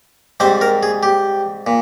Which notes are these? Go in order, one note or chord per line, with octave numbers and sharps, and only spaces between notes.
G#2 G3 C4 C5
A#4
G#4
G4
A#2